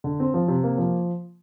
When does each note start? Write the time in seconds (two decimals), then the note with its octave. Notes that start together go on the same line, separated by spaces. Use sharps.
0.04 D3
0.20 C4
0.34 F3
0.48 C3
0.64 A#3
0.78 F3